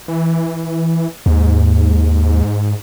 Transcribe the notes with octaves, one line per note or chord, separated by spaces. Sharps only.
E3
D#2 G#2